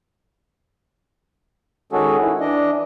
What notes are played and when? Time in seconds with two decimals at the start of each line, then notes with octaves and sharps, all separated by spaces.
1.92 D#3 G#3 C#4 F#4 G#4 A4
2.21 E4
2.40 E3 D4 D#5